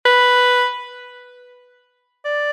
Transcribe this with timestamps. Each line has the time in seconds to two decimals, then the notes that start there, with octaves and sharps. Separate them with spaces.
0.05 B4
2.25 D5